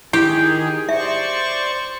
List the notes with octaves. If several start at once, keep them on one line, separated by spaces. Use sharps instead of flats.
D#3 E4 G4 G#4
C5 D5 E5 C#6